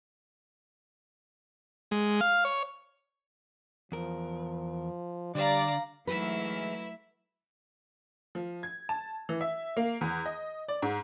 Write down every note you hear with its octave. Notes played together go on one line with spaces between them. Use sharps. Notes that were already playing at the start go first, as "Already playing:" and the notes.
G#3
F5
C#5
E2 F3 A#4
D3 G3 D5 F5 A#5
G#2 E3 F#3 A3 E4 B4 E5 F6
F3
G#6
A5
E3
E5
A#3
E2
D#5
D5
G#2